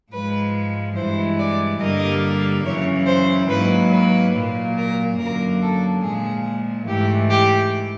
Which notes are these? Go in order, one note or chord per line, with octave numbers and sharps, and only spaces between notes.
G#2 F3 G#3 B4
G2 E3 G#3 C5
D5
G2 D3 G3 A#3 D#5
F#2 C#3 E3 C#5
C5
G#2 D#3 F#3 A#3 B4
B4
A#2 F#3 A#3
A#4
F#2 D3 F#3 A#3 A#4
A4
A#2 F3 G#3 G#4
G#2 E3 A3 G4
G4